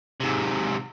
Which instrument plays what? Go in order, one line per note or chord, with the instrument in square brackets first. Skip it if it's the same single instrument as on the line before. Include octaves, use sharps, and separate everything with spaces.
[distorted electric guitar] G#2 C3